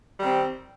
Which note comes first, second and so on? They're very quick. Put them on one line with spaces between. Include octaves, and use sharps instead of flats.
G3 D#3 C4